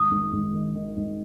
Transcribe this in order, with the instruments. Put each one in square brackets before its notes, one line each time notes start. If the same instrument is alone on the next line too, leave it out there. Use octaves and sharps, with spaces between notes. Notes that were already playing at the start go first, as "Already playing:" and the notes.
Already playing: [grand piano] G#1 [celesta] D#6
[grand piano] G#1
G#1
D#3
D#3
G#1